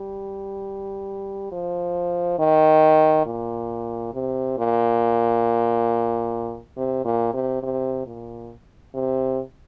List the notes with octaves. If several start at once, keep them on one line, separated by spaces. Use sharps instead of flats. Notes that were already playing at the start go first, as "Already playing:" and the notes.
Already playing: G3
F3
D#3
A#2
C3
A#2
C3
A#2
C3
C3
A#2
C3